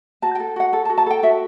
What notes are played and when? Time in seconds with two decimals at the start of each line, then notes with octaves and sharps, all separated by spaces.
0.22 F#4 A5
0.35 G5
0.40 A4
0.56 F#4 F#5
0.73 A4
0.85 A5
0.90 F#4
0.98 A5
1.06 A4 G5
1.23 F#4 E5